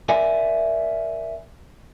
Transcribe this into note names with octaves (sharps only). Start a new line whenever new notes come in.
A#4 D5 E5 G#5